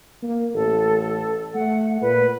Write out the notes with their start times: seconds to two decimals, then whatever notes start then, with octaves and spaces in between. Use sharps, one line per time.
0.22 A#3
0.54 A1 A4
1.54 A3 F#5
2.01 A#2 B4